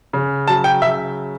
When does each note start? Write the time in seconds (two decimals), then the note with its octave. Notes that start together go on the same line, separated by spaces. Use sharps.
0.13 C#3
0.48 F#3 A5
0.64 G5
0.82 C#3 E5